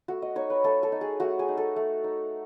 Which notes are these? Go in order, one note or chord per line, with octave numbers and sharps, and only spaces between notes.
A3 F#4
D#5
D#4 C#5
B4
A3 A4
A4
D#4
G#4
A3 F#4
G#4
D#4
A4
A3
D#4